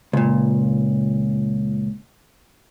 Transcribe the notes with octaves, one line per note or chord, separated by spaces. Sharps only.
C#2 A#2